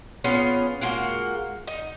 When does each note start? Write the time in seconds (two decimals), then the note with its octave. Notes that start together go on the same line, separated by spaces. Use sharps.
0.24 B3 C#4 F4 G#4
0.81 G#3 A#3 F4 F#4
1.67 D#4